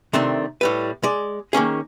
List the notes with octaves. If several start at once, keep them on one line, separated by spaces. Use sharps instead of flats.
C3 D#3 A3 C4 D4
A2 G3 B4
G#3 D5
D#3 A#3 C#4 G#4